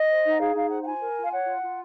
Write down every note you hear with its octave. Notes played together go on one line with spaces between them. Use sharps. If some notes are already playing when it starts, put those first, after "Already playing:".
Already playing: D#5
C5
D#4
F#5
G#4 F5
D#4 F5
C5 F#5
F#5
F4 G#5
A#4
F4
F5
C#5 F#5
F4
F4